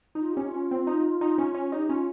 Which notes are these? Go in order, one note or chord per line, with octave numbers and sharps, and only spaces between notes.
D#4 F4
C#4 G4
F4
C#4
C4
D#4
D#4
C#4
C#4
D#4 G4
C#4 F4